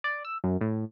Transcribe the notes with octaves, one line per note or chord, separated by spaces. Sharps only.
D5
E6
F#2
A2